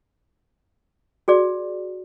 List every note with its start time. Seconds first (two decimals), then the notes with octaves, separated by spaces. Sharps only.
1.28 F#4 G#4 D5